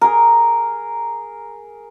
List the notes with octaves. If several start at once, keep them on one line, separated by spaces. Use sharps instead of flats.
G#4 A#4